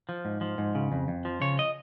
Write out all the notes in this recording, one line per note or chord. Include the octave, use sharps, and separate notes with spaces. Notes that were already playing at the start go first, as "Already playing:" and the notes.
F3
G#2
F3
G#2
C#3
F2
F2
F3
C#3 C#5
D#5